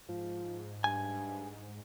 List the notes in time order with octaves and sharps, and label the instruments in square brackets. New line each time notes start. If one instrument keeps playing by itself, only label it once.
[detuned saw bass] G#2 [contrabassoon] F3
[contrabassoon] G2 [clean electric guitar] G#5